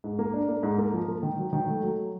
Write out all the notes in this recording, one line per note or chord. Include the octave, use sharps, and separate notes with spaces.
G#2
A#3
D4
A#3
G#2
A#3
F3
A#3
D#3
F#3
D#3
A3
F#3